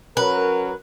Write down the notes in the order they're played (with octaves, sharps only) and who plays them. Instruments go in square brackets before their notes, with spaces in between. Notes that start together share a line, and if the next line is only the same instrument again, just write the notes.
[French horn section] F#3 C#4 A#4 [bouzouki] B4